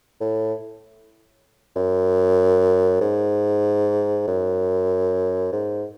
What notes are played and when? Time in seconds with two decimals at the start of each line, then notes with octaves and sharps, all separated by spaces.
0.21 A2
1.76 F#2
3.01 G#2
4.27 F#2
5.52 G#2